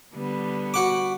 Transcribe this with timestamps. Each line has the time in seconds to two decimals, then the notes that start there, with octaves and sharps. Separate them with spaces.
0.14 D3 G3 B3
0.74 F#4 F#5 D6